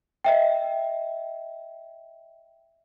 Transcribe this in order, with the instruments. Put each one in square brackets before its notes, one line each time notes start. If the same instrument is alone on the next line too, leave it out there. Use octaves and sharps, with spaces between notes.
[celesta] D#5 E5 G5